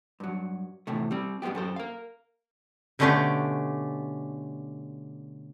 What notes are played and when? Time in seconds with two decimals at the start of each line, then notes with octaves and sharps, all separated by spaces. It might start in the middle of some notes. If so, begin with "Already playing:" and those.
0.20 G2 F#3
0.87 E2 A2 C3 A3
1.11 G3 C4
1.42 G#2 G3 G#3 B3 G4
1.55 F#2 A4 C5
1.76 A#4 F5
2.99 B2 D3 A3 C#4 D4 G4